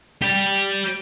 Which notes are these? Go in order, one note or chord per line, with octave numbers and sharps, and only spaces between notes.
G4 D5